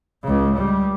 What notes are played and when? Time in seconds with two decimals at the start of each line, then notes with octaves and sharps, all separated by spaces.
0.23 C#2 C#3
0.55 G3